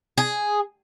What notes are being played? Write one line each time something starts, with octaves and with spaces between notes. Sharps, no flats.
G#4